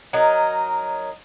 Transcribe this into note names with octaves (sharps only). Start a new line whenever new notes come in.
F#3 D#4 A#4